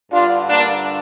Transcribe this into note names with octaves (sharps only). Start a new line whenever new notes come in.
G2 D3 D4 F4
A#3 D4